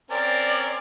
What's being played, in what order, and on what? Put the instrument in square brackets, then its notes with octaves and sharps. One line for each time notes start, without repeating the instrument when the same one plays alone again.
[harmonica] C4 C#4 A#4 [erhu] D5